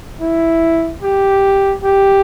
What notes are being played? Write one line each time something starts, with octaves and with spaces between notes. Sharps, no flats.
E4
G4
G4